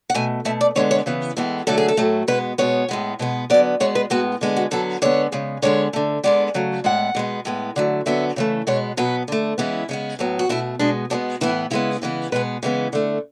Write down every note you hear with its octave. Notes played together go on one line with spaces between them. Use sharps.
F#5
B2 A3 G#5
B2 A3 E5
D5
D3 G#3 B3 C#5
C#5
C#3 E3 B3
A2 E3 G#3 B3
D3 F#3 A3 A4
G#4
A4
A2 F#3 A3
B2 G#3 B3 B4
B2 G#3 B3 C#5
A2 G#3 B3
B2 G#3 B3
D3 F#3 B3 D5
B2 G#3 B3 C#5
B4
A2 G#3 B3 F#4
D3 G#3 B3
F#4
D3 F#3 B3 A4
D3 G#3 B3 C#5
C#3 G#3 B3
D3 G#3 B3 C#5
D3 A3
D3 G#3 B3 D5
C#3 F#3 A3
A2 G#3 B3 F#5
B2 G#3 B3
A2 G#3 B3
D3 F#3 A3
D3 F#3 B3 E5
C#3 E3 A3
B2 G#3 B3 C#5
B2 F#3 B3 B4
D3 A3
C#3 E3 G#3 B3 E4
C#3 G#3 B3
A2 F#3 B3
F#4
B2 A3 E4
B2 G#3 B3 D4
B2 G#3 B3 D4
A2 E3 B3 E4
C#3 G#3 B3 E4
C#3 E3 G#3 B3
B2 G#3 B3 B4
C#3 E3 G#3 B3
D3 A3